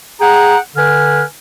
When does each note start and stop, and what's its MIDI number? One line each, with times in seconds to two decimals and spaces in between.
0.21 0.58 68
0.21 0.58 78
0.21 0.58 79
0.21 0.58 82
0.76 1.24 50
0.76 1.24 71
0.76 1.24 80
0.76 1.24 89